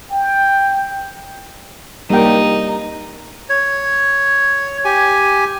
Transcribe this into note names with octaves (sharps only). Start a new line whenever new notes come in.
G5
G3 A#3 D#4 G5
C#5
G4 G#5